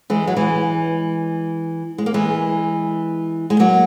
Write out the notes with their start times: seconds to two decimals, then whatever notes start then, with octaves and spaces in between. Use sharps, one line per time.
0.10 E3 G#3
0.27 F#3
0.36 E3 G#3
1.98 G#3
2.06 A#3
2.14 E3 G#3
3.50 G#3
3.59 F#3 A#3